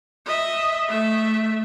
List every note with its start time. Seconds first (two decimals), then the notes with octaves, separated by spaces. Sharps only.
0.26 D#5 E5
0.89 A3 E5